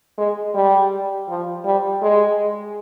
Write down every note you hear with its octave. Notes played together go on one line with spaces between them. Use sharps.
G#3
G3
F3
G3
G#3